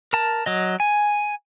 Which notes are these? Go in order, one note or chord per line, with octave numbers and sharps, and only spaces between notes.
A#4 A5
F#3 D#5
G#5